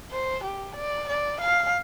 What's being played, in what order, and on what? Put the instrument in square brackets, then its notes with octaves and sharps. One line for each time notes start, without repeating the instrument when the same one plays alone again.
[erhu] C5
G4
D5
D5
F5